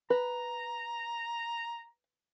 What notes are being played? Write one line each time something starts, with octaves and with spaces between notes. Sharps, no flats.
B4 A#5